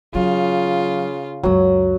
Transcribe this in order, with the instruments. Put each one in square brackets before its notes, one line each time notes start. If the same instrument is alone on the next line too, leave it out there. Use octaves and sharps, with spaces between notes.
[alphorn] C#3 [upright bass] F#3 [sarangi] F4
[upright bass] C#2 F#2 [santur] F#3